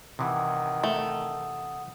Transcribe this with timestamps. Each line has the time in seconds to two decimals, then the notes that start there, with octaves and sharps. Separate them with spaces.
0.19 C3 D#3 E3 F#5 D#6
0.84 A3